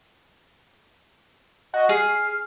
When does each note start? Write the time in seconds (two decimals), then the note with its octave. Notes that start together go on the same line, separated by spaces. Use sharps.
1.74 F#4 D#5
1.89 G#4 F6 C7